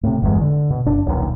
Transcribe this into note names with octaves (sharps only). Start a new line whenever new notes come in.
A2 C3
G1 E2 G#3
D3
B2
F#1 D4
D#1 B1